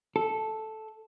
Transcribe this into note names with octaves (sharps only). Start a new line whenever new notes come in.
A4